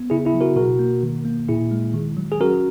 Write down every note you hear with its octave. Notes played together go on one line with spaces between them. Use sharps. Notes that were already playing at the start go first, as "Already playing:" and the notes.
Already playing: B3
C#3 E4 G#4
E4 G#4
F#3
F#4 A#4
B2 F#4 A#4
A#3
D#3
A#3
A#2 E4 G#4
G#3
D#3
F#3
G#4
C#4 F#4 A#4